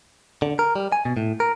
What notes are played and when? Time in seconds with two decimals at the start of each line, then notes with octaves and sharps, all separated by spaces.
0.42 D3
0.59 A#4
0.76 G3
0.92 G#5
1.05 B2
1.17 A2
1.40 A#4